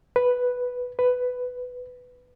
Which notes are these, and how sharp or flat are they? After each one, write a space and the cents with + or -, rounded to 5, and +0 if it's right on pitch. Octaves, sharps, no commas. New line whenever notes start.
B4 +0
B4 +10